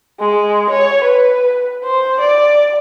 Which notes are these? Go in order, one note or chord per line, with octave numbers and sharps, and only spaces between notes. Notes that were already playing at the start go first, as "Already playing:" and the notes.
G#3
C#5
B4
C5
D5